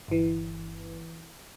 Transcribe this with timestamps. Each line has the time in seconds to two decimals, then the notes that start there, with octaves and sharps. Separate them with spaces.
0.08 G1 E3